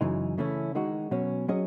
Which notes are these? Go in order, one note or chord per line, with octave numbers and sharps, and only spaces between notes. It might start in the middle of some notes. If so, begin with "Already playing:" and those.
F#2 C#3 E3 G#3 D#4
C#3 E3 A3 C#4 E4
D#3 G#3 D#4 F#4
B2 F#3 C#4
F#3 C#4 G#4 D#5